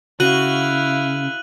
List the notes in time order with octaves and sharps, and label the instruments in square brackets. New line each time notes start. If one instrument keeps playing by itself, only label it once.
[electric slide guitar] C#3 [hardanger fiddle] E4 F5 [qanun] F#4 [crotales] F#6 D#7 F#7